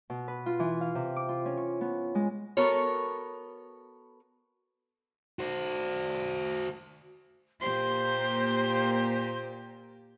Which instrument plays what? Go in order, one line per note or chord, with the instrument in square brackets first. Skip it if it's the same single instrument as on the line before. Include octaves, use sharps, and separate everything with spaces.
[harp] B2
B4
F4
E3
F5
C3
D6
F4
C#4
C#6
B3
G#3
[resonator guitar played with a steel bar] B3 F#4 A4 A#4 C#5
[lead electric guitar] F#4 C5
[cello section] A#2 A#3 G4 [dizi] C5 [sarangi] C6